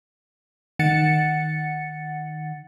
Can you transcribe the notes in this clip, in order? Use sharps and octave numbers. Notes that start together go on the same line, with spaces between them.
D#3 F#5 A6 C#7